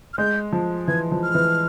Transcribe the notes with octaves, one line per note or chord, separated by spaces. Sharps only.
F6
G#3 G6
F3
E3 G#6
F3
F6
E3